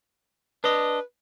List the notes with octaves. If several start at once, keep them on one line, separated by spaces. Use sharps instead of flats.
D4 B4 D#5